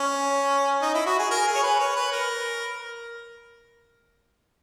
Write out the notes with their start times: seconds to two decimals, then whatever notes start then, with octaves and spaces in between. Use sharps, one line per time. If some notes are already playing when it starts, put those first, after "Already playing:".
Already playing: C#4
0.82 D#4
0.94 E4
1.06 F#4
1.19 G#4
1.31 A#4
1.47 G#4
1.55 C#5
1.63 B4
1.79 C#5
1.96 B4
2.12 A#4